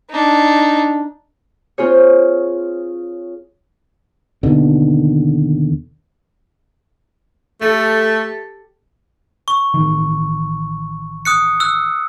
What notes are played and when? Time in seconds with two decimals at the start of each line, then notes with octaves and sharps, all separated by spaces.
0.10 D4 D#4
1.78 C4 F4 G#4 C#5
4.43 D#2 B2 D3 D#3
7.61 A3 G4 A4
9.48 C#6
9.74 A1 D#3
11.25 D#6 F#6 C#7
11.60 E6 F#6